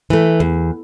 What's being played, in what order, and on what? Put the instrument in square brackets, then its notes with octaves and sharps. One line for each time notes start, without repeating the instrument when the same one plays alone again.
[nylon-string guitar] E3 A3
E2